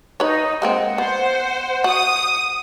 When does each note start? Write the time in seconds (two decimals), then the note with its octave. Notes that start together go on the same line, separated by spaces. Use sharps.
0.20 D#4 B4 C#5
0.62 G#3 A#3 C4 F#5
0.98 B3 C5
1.84 F#4 D#6